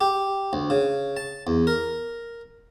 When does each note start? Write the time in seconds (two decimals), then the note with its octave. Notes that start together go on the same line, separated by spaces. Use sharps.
0.01 G4
0.53 D2
0.70 C#3
1.17 A5
1.47 E2
1.67 A#4